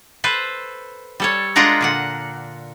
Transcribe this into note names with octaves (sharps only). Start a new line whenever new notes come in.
A4 B4 C5
G3 A4 C#5
G#3 D4 F4 A#4 F#5 A#5
A#2 D3 F#5